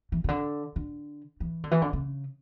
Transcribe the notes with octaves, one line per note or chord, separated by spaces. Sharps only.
E3
C#3
D3
D3
E3
D3
E3
D3
C#3